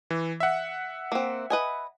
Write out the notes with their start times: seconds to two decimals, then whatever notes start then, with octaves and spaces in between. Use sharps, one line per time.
0.10 E3
0.40 E5 F#5
1.12 A#3 C4
1.50 B4 D#5 G#5